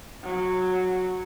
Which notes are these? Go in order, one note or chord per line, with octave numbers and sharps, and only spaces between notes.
F#3